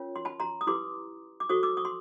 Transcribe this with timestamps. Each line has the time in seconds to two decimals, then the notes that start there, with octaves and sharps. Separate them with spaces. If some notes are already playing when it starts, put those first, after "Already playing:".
Already playing: C#4 F4 A#4 C#5
0.16 C6
0.25 A5 B5
0.40 A#5 C6
0.61 D#6
0.67 E4 G4 B4 C6 D6
1.40 D6
1.49 F#4 A4 C5 C#6 D#6
1.63 D6 E6
1.77 C#6 D#6
1.85 C6